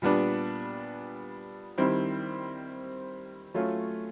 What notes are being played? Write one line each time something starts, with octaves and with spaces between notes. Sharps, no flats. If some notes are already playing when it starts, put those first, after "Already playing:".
A#2 G3 B3 D4
D#3 G3 C4 E4
F#3 A3 C#4 F4